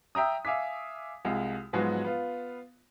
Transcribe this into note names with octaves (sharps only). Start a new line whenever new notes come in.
E5 G5 A#5 D#6
E5 F5 G#5 D6 B6
C2 G#3 F4
G#2 F3 F#3 G#3 B3 F#4
B3 F4